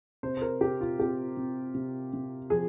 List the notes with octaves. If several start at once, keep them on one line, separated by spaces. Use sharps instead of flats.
C3 C5
C5
A#4
C3 G4
F4
C3 G4
C3
C3
C3
F3 G#4